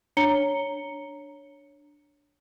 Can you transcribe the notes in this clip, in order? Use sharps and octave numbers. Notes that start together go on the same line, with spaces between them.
D4 C#5 A#5 C#7 G7